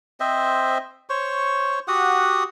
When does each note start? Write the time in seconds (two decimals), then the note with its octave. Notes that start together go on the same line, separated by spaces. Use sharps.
0.20 C4 C5 D#5 E5
1.09 C5 C#5 C#6
1.88 F#4 G4 F#5 D#6